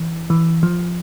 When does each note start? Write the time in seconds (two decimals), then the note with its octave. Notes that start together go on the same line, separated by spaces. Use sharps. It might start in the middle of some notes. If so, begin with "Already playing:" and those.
Already playing: E3
0.30 E3
0.63 F3